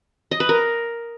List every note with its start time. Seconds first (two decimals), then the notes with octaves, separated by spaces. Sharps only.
0.31 D#5
0.40 B4
0.49 A#4